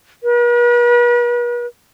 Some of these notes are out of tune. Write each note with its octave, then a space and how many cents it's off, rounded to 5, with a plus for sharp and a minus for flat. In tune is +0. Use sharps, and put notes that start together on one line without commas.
B4 -45